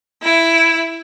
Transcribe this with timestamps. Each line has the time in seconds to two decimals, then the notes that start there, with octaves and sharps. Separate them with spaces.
0.23 E4